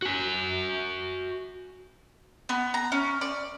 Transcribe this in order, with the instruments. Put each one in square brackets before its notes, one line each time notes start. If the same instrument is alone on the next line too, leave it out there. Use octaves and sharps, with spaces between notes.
[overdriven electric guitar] F#4 G#5
[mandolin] B3
A#5
C#4
D5